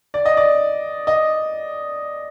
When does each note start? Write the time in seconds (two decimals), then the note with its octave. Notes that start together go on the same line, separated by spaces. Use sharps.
0.14 D5
0.25 D#5
0.37 D5
1.07 D#5